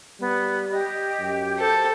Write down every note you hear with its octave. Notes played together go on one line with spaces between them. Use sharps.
G3 B3
G4 D#5
F#2
A4 C5